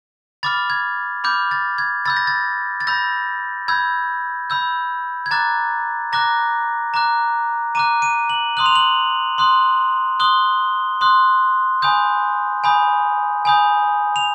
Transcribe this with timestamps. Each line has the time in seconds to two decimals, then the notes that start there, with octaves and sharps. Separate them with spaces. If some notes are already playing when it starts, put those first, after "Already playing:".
0.43 B5 D6 F6 A6
0.70 G#6
1.24 B5 D6 F6 G6
1.51 A6
1.78 G#6
2.05 B5 E6 G6 A6
2.17 A#6
2.27 A6
2.80 A6
2.87 B5 E6 G6 A#6
3.68 B5 E6 G6 G#6
4.50 B5 E6 G6
5.26 G#6
5.31 A#5 D6 F#6 A6
6.13 A#5 D6 F#6 A#6
6.94 A#5 D6 F#6
7.75 A#5 D6 F#6 D#7
8.02 D#7
8.30 F#7
8.57 C6 D#6 F#6 F#7
8.66 F7
8.75 F#7
9.38 C6 D#6 F#6
10.20 C6 D#6 F#6 G7
11.01 C6 D#6 F#6
11.82 G#5 B5 D#6 G6
12.64 G#5 B5 D#6 G6
13.45 G#5 B5 D#6 G6
14.16 F7